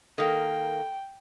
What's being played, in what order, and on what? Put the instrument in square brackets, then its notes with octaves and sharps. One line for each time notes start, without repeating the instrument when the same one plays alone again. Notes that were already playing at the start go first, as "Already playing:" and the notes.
[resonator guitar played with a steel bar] D#3 A#3 [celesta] A4 [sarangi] G5